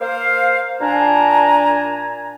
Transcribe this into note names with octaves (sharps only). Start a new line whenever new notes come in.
A#3 C5 F5
A#2 D4 G#5 A#5